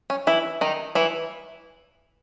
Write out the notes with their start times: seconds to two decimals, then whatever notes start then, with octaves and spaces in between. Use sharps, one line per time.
0.10 C#4
0.27 E3 E4
0.61 D#3 D#4
0.95 E3 E4